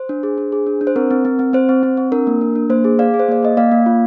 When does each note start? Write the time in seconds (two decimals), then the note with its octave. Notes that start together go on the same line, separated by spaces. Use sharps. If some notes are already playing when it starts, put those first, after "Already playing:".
Already playing: C5
0.09 D4
0.23 G#4
0.38 D4
0.52 G#4
0.67 D4
0.81 D4
0.87 C5
0.96 C4 A#4
1.10 C4
1.25 C4
1.39 C4
1.53 C4 C5
1.69 C4
1.83 C4
1.97 C4
2.12 D4 A#4
2.27 A#3
2.41 D4
2.55 D4
2.70 A#3 C5
2.84 G#4
2.99 G#4 D5 F5
3.14 G#4
3.19 C5
3.28 A#3 D5
3.43 A#3 D#5
3.57 A#3 D5 F5
3.71 A#3
3.86 F4